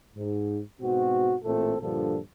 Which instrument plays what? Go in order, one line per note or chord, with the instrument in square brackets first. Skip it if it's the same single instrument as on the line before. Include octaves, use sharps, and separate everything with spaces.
[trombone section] G#2
G#2 B2 C4 F#4
A1 A#2 A3 C4 A4
G2 A#2 D3 F3 A4